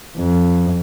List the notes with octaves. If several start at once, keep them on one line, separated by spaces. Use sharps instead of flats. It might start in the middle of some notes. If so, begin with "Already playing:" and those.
F2